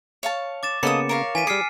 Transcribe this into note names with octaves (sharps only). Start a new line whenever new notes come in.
C#5 F5 A5
D6 A6 E7
C#3 A#3 B3 A4 D#5 D#6 C#7
A#4 C#5 F5
E3 G#5 B6 D#7
G3 G#4 D6 F6 C7 C#7